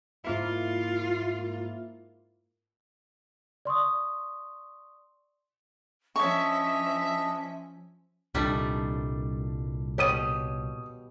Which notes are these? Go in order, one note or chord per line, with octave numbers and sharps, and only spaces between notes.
G#2 A#3 E4 F4
D5 C6 C#6 D#6
F3 C#4 D4 C#5 D#5 E5 C#6
C2 A#2 D#3 G3 A3 D4
B2 G4 C#5 D#6 D#7